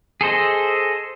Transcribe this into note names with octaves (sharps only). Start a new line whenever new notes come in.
G#4 A4 C5 D#5